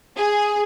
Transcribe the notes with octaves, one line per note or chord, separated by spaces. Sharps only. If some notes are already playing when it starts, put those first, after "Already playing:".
G#4